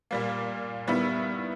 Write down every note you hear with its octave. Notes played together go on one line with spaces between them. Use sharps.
A#2 G3 A#3
D#3 G3 B3 E4